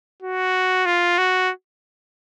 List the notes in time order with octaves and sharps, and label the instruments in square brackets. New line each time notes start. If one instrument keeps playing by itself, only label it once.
[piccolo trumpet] F#4
F4
F#4